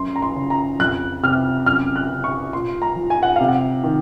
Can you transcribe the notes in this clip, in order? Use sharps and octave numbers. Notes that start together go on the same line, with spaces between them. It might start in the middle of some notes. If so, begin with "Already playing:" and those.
Already playing: F#2 C6
A#5
C6
C#3
A#5
F2 F#6
C3 F6
F#2 F6
F#6
C#3
C#6
A#2 C6
A#5
F3
G#5
F#5
C3 F5
F#5
D#3